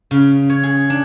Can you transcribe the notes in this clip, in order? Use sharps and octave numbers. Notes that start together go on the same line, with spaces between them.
C#3
C#5
G#4
D4